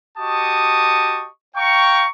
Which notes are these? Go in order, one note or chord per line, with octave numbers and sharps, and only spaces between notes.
F#4 G4 D#5 A5 C#6 D#6
F5 G5 A#5 C#6